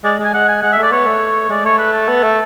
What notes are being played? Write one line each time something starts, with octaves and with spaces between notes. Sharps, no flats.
G#3 D5
G#3 G#5
G#3 F#5
G#5
G#3 F#5
E5
A3
D5
B3 C#5
A3
G#3 D5
A3 C#5
B4
A4
B3
A3